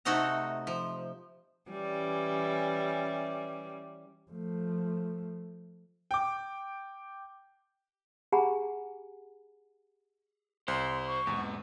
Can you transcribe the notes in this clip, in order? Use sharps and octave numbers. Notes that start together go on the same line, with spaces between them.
C3 A3 D#4 F#4 A4 A#5
F3
E3 G3 C#4
F3 A3
G5 D6
G4 G#4 F#5 G#5 A#5 B5
C2 C5 C6
C#6
E2 G#2 B2